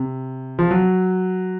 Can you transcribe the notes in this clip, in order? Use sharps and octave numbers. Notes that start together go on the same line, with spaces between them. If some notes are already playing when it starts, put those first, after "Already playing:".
Already playing: C3
F3
F#3